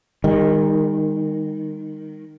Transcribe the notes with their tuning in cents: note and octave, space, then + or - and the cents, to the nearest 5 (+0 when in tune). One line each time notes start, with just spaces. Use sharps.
D#3 -5 G3 +45